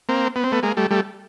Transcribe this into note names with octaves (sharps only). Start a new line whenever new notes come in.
A#3 C4
B3
C4
A3 B3
G#3 A#3
G3 A3
G3 A3